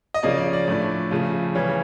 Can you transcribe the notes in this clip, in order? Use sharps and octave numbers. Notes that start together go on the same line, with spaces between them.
D#5
C#3 F3 A#3 C#4 D5
D5
D5
A2 F3 A3 D4 D5
C#3 F3 A3
C#3 E3 G3 C#5